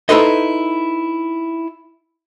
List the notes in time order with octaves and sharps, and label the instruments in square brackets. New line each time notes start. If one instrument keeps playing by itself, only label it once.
[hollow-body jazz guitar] D#4 E4 A4 B4 C5 D#5